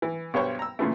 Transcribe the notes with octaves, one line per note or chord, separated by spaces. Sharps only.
E3
B1 G2 B3 C5 C#5 C#6
A#5 E6
A#2 C#3 E3 A3